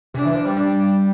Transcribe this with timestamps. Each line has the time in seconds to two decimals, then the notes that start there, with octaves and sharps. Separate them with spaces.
0.14 C3 D4
0.25 E3
0.35 F3
0.45 G3
0.56 D4